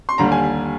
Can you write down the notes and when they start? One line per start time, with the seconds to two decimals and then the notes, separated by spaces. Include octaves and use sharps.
0.09 C6
0.18 D#2 D3 G3 A#5
0.32 G#5